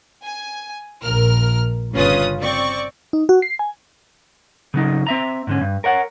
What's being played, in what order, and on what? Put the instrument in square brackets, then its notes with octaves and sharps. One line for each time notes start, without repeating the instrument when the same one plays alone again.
[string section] G#5
A#1 A#4 F6
G1 C#3 C#4 F4 B4 D#6
C4 D5 C#6
[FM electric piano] D#4
F#4
C7
G#5
[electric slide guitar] C#3 F#3 D#4
C4 E5 A#5
G#2 D3 C#4
G2
A#4 C#5 F#5